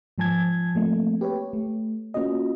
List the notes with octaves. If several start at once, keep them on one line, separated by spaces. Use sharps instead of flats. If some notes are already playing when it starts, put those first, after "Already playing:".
G#2 F3 G#5 A5 G#6
F3 A3 A#3 C4
G4 B4 C#5
A3
A#3 C#4 F4 F#4 D#5